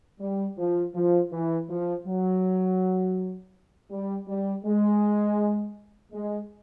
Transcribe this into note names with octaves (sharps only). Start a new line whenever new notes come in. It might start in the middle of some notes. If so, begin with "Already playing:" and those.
G3
F3
F3
E3
F3
F#3
G3
G3
G#3
G#3